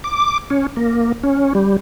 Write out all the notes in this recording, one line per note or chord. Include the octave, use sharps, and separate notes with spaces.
D6
C#4
A#3
C#4
G3